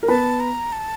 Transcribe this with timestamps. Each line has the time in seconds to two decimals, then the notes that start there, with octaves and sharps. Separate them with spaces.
0.03 A#4
0.08 B3 B4 A5
0.40 A#5
0.72 A5